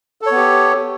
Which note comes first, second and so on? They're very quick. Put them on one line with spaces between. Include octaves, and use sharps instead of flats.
A4 C#5 B3 G4